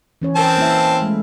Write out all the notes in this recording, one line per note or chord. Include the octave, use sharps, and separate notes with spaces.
E3 C#4 C#5
C4 A#4 B4 A5
A#3 E4 E5
G#3 A3